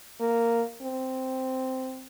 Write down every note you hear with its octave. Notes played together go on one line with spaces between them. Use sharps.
A#3
C4